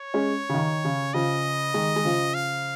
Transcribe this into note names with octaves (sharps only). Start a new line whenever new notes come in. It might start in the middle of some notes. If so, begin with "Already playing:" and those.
Already playing: C#5
G#3 C#4
C#3
D#3
C#3
C#3 F3 D#5
D#3 G#3
G#3
C#3 F3
F5